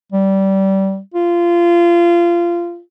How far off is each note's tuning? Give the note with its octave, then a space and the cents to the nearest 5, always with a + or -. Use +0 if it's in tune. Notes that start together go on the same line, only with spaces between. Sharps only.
G3 -20
F4 -20